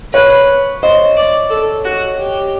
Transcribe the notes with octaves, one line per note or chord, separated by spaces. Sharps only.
B4 C#5
C5 D#5
D5
A4
F#4
G4